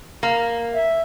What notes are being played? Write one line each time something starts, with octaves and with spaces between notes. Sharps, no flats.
A#3
E5